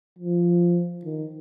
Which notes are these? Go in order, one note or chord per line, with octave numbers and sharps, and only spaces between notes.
F3
D#3